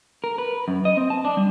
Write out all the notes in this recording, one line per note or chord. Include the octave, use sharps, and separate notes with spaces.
A#4
B4
F#2
D#5
C4
A5
D4
G3